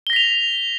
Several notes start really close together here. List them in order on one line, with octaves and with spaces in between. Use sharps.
G7 A#6 B6 F7